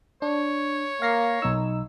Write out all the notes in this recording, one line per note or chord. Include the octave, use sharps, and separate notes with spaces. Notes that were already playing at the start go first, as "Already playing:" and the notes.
D4 C#5
A#3 F5 A#6 C7
B1 D#4 E6